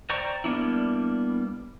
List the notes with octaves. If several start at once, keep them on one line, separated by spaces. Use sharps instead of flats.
C5 D5 G5 A#5 C#6
G3 A#3 B3 D4 E4